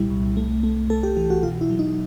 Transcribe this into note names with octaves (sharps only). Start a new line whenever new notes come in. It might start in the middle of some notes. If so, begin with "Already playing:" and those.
Already playing: C2 A#2 G3 E4
C2
A3
A3
A3 A4
G4
E3 G4
F#4
B2 F4
E4
F#3
D#4